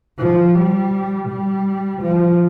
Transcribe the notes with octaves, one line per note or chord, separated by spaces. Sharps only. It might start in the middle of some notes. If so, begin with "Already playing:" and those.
F3
G3
G3
F3